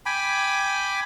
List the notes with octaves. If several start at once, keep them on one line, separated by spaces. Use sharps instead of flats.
G5 G#5 B5 D6